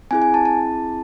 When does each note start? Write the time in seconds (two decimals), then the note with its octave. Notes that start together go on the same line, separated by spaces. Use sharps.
0.11 C4 E4 G#4 G#5
0.22 G#5
0.34 A5
0.45 A5